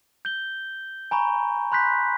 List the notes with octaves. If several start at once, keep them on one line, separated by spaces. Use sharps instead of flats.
G6 G7
G#5 A#5 B5 C#6
B5 C6 F#6 G6 B6